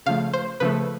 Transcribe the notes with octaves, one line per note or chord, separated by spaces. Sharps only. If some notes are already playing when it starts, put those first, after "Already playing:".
C#3 F3 A3 F5
C5
C#3 F3 A3 B4